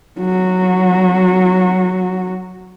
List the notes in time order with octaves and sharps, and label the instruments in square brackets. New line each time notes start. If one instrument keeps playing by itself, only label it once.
[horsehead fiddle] F#3 F#4